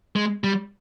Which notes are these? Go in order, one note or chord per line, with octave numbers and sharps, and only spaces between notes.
G#3
G3